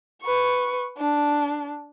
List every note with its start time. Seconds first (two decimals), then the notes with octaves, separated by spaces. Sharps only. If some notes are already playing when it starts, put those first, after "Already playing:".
0.22 B4 C#6
0.98 D4